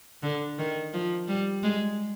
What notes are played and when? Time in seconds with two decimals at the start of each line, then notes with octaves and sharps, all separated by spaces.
0.23 D3
0.58 D#3
0.94 F3
1.28 G3
1.63 G#3